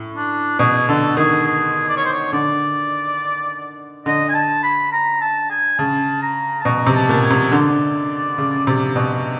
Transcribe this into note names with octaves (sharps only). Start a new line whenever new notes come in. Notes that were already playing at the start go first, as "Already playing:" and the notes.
Already playing: A2
D4
B2 G#4
D3 A4
D#3 G#4
G#4
D5
C#5
C5
C#5
D3 D5
D3 D#5
G#5
A5
B5
A#5
A5
G#5
C#3 A5
A#5
A5
B2 A#5
C3
A5
A#2
G#5
C3
D3 D5
C#3
C3
B2